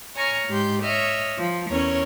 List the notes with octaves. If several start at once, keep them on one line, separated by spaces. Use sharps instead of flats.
C#5 G#5 A#5 C#6 F6
G#2 G#3 G4 C6 G6
C#5 D#5 E5 F6
F3
E2 C#4 A#4 C#5